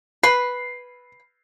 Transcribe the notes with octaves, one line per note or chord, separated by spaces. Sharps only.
B4 C7